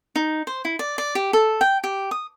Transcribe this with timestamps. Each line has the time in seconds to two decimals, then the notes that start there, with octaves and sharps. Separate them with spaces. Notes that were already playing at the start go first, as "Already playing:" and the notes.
0.16 D#4
0.47 C5
0.65 E4
0.79 D5
0.98 D5
1.15 G4
1.33 A4
1.61 G5
1.84 G4
2.11 D#6